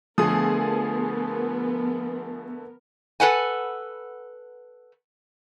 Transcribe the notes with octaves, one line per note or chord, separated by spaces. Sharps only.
D3 F3 A3 B3 G#4 A#4 D#6
A4 B4 F#5 G#5